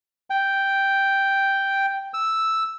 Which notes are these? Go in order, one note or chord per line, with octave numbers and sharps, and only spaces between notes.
G5
E6